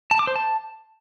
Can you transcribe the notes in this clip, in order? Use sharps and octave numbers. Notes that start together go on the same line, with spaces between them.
A5
D6
C5
A5